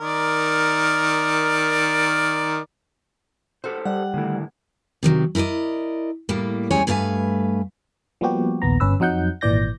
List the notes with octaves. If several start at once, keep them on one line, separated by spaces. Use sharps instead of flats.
D#3 A#4 D5
F#4 G4 A4 C5
G3 F#5
A2 D3 D#3 A3 E4
C3 D#3 F#3
E4 A#4 B4 D5 D#5
A2 G3 A#3
D2 G3 G#3 C#4 C#5 G#5
G2 A3 B4 F5 G#5
F3 G3 A#3 B3 F#4 G4
A#1 D#2 B3 A#5
G1 C#4 B4 E6
F2 F#3 D#4 F#5 G6
G#1 A#2 E3 D5 G6 A#6